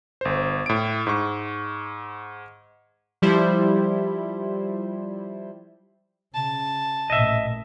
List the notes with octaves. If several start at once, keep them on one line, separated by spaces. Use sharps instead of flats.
G1 C5
A2 D7
G#2 C#6
F3 G3 E4 C5
C#3 A5
A1 A#2 D#5 E5